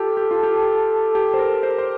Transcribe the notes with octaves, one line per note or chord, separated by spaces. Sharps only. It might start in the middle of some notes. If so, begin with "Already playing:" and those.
Already playing: F4 G4 A4
G4
F4
G4
G4
C5
A#4
C5
C5